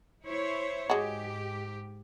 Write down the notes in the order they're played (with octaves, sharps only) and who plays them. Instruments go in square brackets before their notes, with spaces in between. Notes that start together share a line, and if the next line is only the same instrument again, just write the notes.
[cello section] E4 C5 C#5
[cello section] G#2 G4 [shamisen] G#3 F#4